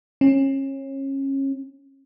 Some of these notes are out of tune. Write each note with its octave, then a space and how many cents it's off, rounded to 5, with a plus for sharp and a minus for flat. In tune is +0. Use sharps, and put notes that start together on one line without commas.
C#4 -30